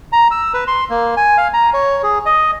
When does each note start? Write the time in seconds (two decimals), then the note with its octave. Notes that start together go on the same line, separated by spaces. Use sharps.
0.12 A#5
0.31 E6
0.54 B4
0.67 C6
0.90 A#3
1.17 G#5
1.37 F5
1.54 A#5
1.74 C#5
2.03 G#4
2.26 D#5